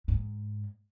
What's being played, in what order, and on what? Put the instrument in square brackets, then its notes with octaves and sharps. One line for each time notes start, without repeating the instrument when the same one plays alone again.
[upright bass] G#2